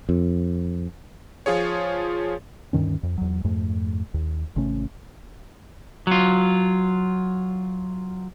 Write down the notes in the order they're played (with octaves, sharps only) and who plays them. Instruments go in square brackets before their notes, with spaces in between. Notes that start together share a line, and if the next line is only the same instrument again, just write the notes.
[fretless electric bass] F2
[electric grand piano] F3 F4 G#4 C#5
[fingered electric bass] D2 G2 D#3 C#4
F2
E2 F#3
F2 G#2 A3
D#2
G#1 C3 A3 C#4
[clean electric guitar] F#3 F4